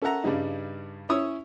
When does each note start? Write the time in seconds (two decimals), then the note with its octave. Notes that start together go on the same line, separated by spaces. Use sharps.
0.02 C#4 A4 A#4 E5 F#5 A#5
0.24 G2 C#3 G3 D#4
1.09 C#4 E4 C#5 C#6 D#6 E6